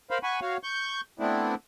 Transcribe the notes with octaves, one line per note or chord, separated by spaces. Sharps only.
A#4 C5 F5 B5
F#5 G#5 B5 C#6
F#4 C#5 F5
C#6 G6
A3 B3 C4 D4 E4